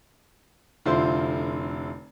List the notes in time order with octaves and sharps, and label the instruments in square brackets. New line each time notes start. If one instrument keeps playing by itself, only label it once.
[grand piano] F1 D3 E4 F4 C5 C6